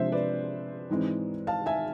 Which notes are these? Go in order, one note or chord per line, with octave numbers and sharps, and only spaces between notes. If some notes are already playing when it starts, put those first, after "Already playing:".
Already playing: C3 F3 G#3 D4 C5 E5
B4 D5
G#2 E3 G#3 C4
F5 A5
E5 G#5